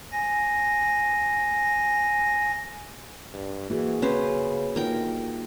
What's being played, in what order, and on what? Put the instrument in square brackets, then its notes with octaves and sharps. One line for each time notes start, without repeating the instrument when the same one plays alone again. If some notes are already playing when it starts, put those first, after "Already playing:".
[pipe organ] G#5 A#6
[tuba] G2
[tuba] E3 [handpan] A#3 F#4 G#4
[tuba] C#3 [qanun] C#4 B4 C5
[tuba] G1 [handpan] A#3 D#4 F4 [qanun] A#4 G5